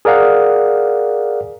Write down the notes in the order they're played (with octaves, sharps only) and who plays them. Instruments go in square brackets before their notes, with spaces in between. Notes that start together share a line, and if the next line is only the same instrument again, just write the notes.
[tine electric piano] G#4 A#4 D5 F5 F#5